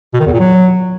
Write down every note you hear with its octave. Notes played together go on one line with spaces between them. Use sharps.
B2
D#3
E2
A#2
F#3